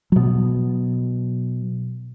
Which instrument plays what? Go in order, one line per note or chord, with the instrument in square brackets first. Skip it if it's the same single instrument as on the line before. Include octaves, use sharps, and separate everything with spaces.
[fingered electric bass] B2 F#3